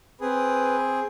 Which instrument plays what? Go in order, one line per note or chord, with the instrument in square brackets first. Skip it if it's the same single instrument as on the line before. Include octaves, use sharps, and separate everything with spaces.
[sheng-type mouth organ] C4 G#4 [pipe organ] B4